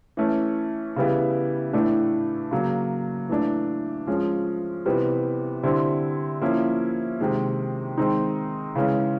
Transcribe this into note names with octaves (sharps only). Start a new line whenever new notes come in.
E3 A3 C#4
C#3 E3 G3 B3 E4
A2 E3 A3 D4
C#3 F#3 A#3
E3 A3 D4
F3 G#3 C#4
C3 E3 G3 B3
D3 G3 C4 E4
F3 A#3 C#4 E4
C3 D#3 G#3
D#3 G#3 C4 D#4
C#3 E3 G#3 C#4